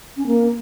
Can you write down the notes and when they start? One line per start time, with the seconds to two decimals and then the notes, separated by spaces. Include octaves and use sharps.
0.17 C#4
0.27 A#3